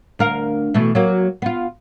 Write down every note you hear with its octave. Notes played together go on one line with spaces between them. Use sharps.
D2 A#4 F5
B2 E3 A3
F#3 A#3
B3 F4